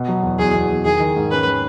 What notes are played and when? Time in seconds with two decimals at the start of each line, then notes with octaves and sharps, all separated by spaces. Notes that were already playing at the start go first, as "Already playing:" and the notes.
Already playing: B2
0.08 F#3
0.23 E2
0.39 E2 G#4
0.54 E2
0.69 E2
0.85 D#3 G#4
1.00 D#3
1.16 G#2
1.31 C#4 B4
1.47 D#3